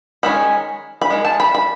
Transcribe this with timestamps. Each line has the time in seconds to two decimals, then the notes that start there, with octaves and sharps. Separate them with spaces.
0.23 D#3 G#3 C#4 B5
1.01 B5
1.10 D#3 G#3
1.25 A5
1.40 B5
1.55 B5